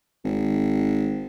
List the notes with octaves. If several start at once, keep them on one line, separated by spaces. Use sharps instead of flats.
G#1